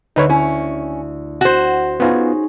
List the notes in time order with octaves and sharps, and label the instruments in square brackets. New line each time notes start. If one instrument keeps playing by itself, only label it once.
[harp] D2 D3 [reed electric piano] D#4 B4 C#5
[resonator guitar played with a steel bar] C#4 [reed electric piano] E4
[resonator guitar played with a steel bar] F#4 C5
[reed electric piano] B3 F4 [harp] C#4 D#4 G#4